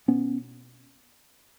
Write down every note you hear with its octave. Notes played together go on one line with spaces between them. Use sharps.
B2 B3 C#4